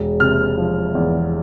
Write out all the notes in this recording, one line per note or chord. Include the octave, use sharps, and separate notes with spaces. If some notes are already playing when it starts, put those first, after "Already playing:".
Already playing: E1
C3 F6
F3
E2